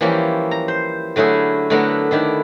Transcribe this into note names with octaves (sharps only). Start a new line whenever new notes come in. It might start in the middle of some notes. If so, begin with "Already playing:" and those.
E3 F3 G3 A#3 C#4 E4
A#5
C5
D3 F#3 A3 E4 G#4
D3 F#3 A3 B3 E4 A#4
D3 D#3 E4 D5